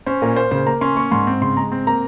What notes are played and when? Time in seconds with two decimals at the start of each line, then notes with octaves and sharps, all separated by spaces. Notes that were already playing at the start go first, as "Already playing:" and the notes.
0.06 C#4 C5
0.22 A#2 A#4
0.36 A#3 C5
0.51 C#3 C5
0.67 A#3 A#5
0.81 C#4 C6
0.96 A#3 C#6
1.11 G#2 C6
1.27 C4
1.41 C#3 C6
1.57 G#3 A#5
1.72 C4
1.87 A#3 A#5